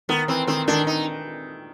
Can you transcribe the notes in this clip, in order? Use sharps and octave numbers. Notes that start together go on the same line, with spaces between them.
D#3 B3
E3 C4
D#3 C4
D#3 D4
D#4